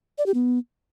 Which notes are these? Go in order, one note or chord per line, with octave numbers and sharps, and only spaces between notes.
D5
G4
B3